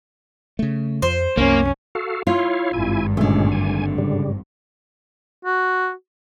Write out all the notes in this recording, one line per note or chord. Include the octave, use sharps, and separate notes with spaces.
C#3 A3
F2 F3 C5
C2 F#2 A#3 C#4
F#4 A4 F5
E4 F4 C#5 F5
G#1 G2 E4 G#5
A#2 D3 G#3 A3 C#4
G#5
C#3 G3
F#4